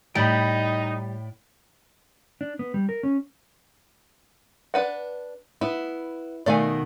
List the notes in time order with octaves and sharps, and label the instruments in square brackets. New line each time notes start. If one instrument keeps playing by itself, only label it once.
[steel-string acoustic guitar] A2 [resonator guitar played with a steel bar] G3 [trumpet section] D#4 [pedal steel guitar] G5 B5
[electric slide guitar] D4
B3
G3
A#4
C#4
[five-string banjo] D4 B4 F#5
[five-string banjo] B3 [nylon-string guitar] E4
[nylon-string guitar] B2 D#3 A3 [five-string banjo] D5 F5 G#5